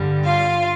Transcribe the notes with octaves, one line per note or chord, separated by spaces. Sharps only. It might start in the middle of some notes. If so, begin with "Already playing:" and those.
Already playing: G2 D3 G3
F4 F5